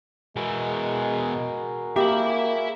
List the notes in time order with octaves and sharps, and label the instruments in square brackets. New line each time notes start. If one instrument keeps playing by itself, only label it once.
[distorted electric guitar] B2 E3 [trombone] G#3 [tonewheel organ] F#4 G#4 A#4
[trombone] A#3 [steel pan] G4 [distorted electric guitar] E5 B5